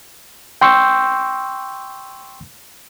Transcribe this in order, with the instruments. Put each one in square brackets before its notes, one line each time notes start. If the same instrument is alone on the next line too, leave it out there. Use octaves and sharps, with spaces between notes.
[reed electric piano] G5 C6 C#6 E6 G6